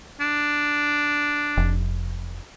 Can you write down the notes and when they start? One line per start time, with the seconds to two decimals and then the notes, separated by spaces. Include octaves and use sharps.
0.20 D4
1.57 F1